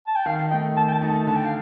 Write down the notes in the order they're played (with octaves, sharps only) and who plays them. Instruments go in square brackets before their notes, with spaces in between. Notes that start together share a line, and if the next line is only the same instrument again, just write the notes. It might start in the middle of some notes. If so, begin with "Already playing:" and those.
[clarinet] A5
G5
[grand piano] D#3 [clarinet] F5
[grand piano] A3 D#4 [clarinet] G5
[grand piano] D#3 [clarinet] A5
[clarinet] G5
A5
[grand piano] A3 D#4
[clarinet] A5
[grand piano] D3 [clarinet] A5
[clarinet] G5
F5